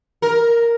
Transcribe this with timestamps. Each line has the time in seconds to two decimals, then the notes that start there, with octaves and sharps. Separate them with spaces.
0.22 A#4